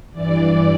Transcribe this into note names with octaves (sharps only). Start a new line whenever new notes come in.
G2 E3 D5